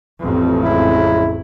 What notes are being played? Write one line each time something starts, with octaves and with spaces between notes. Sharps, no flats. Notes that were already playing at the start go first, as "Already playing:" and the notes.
A1 F2
C#3 G#3 E4